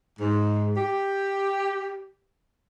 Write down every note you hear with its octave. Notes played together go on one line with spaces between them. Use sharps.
G#2
G4